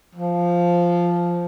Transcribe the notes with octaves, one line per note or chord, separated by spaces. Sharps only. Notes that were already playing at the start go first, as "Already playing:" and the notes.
F3